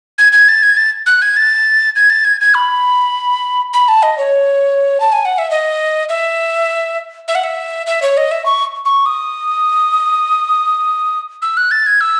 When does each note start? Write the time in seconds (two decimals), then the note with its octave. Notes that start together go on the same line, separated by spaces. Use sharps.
0.18 G#6
0.32 G#6
0.48 A6
0.63 G#6
0.77 A6
1.06 F#6
1.22 G#6
1.37 A6
1.96 G#6
2.10 A6
2.25 G#6
2.41 G#6
2.54 B5
3.73 B5
3.88 A5
4.03 D#5
4.18 C#5
5.00 A5
5.12 G#5
5.25 F#5
5.38 E5
5.51 D#5
6.09 E5
7.28 E5
7.35 F#5
7.43 E5
7.87 E5
8.02 C#5
8.17 D#5
8.31 E5
8.46 C#6
8.85 C#6
9.06 D#6
11.42 E6
11.57 F#6
11.71 A6
11.86 G#6
12.01 E6